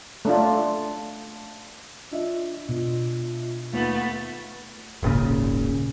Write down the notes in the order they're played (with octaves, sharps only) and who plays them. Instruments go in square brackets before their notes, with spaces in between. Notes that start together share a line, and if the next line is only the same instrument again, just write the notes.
[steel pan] A3 D4 F4
[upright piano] D4 D#5 E5 [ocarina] F4
[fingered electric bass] B2 [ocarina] F4
[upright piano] D#2 F7 F#7 [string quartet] A3 B3 [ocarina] F4
[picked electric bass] D#1 G#1 A#2 C#3